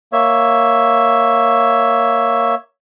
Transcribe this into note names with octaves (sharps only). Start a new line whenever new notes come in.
A#3 C#5 E5